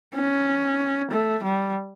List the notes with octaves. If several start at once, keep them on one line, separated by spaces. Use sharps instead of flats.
C#4
A3
G3